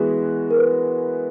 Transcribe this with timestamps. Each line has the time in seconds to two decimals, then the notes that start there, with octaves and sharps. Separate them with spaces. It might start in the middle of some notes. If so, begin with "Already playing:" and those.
Already playing: E3 G#3 B3 F#4 G#4
0.51 A#4
0.58 B4